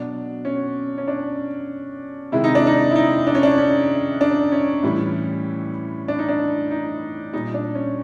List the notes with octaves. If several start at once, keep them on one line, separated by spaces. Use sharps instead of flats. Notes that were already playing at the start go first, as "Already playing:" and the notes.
Already playing: B2 F#3 D4
C#4
C#4
D4
C3 D#3 G#3 E4
D#4
D4
D#4
E4
D#4
D4
C#4
D4
C#4
D4
C#4
A2 E3 G3
D4
D#4
D4
D#4
A#2 G3 D#4
D4
C#4